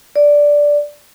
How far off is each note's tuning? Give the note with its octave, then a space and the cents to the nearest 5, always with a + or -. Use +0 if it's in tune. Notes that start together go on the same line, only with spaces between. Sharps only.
D5 -5